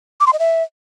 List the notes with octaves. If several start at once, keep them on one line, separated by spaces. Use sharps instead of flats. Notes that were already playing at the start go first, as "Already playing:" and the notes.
D6
C6
D#5
E5